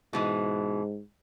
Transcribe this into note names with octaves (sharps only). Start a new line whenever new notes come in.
G#2 B2 E3 G#3